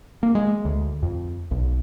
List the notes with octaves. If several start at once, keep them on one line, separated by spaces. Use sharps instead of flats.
A#3
G#3
D2
F2
B1